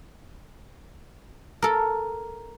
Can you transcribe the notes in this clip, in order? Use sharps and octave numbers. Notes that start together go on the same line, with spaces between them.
A4 A#4